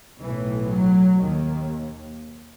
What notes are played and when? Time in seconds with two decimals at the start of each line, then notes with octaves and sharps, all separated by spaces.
0.20 B1 A2 E3
0.69 F#3
1.17 D#2 D#3